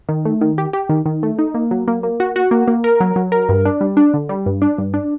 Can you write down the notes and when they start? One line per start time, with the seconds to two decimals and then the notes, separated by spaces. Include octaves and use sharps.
0.09 D#3
0.25 A3
0.41 D#3
0.58 G4
0.73 G4
0.89 D#3
1.06 D#3
1.23 A3
1.39 D#4
1.54 A#3
1.71 F#3
1.88 A#3
2.03 A#3
2.20 F#4
2.36 F#4
2.51 A#3
2.68 A#3
2.84 A#4
3.00 F#3
3.16 F#3
3.32 A#4
3.49 G2
3.65 D4
3.81 G3
3.97 D4
4.14 D3
4.29 G3
4.46 G2
4.62 D4
4.78 G2
4.94 D4